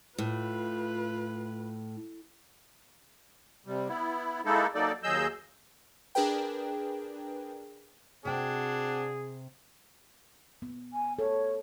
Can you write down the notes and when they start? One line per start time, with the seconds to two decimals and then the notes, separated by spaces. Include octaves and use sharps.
0.18 A2 F4 B4
3.66 C3 G3
3.88 B3 E4
4.45 G#3 A#3 D#4 E4 A4
4.75 F#3 A#3 D#4 A4 D5
5.03 D#2 F#3 G#4 D#5 E6 G6
6.15 D4 G#4 A#4 B4 G5
8.25 C3 C4 D4 F#4 G#4 F#5 G5
10.62 B3
10.93 G#5
11.19 A4 C#5